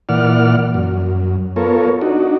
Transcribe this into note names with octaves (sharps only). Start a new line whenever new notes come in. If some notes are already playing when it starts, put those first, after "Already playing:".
A#2 E3 D5 F#5 F6
F#2
B3 F4 A4 A#4 C#5
D4 D#4 F#4